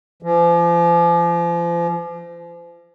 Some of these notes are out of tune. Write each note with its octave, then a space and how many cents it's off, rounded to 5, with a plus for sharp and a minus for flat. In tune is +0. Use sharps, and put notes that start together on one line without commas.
F3 -35